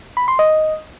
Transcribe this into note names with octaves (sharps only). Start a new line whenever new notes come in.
B5
C6
D#5